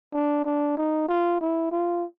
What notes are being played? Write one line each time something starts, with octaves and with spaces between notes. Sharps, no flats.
D4
D4
D#4
F4
E4
F4